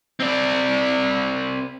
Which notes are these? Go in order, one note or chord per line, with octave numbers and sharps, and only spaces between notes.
C4 D5